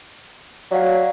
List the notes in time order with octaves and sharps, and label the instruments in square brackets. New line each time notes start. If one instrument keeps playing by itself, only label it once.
[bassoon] F#3 [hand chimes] D5 F5 F#5